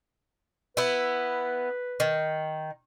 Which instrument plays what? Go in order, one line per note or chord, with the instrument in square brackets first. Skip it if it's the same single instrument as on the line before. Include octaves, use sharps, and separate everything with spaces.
[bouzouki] B3 E4 [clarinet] B4
[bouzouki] D#3